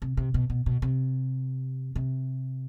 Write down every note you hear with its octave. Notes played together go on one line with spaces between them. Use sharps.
C3
C3
B2
B2
B2
C3
C3